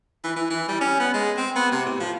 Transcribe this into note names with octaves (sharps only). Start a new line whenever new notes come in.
E3
E3
E3
G3
C#4
B3
G#3
C4
B3
C3
A2
F3